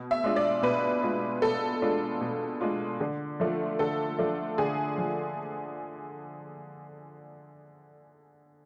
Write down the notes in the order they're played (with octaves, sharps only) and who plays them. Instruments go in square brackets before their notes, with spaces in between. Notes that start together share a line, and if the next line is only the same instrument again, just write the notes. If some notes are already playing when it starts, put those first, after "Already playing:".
Already playing: [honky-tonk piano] B2
E5
G#3 D4 F4
D5
B2 B4
G#3 D4 F4
B2 A4
G#3 D4 F4
B2
G#3 D4 F4
D3
F3 A3 D4 F4
D3 A4
F3 A3 D4 F4
D3 G#4
F3